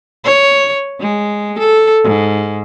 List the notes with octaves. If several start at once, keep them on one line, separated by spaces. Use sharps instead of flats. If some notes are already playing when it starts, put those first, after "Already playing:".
C#5
G#3
A4
G#2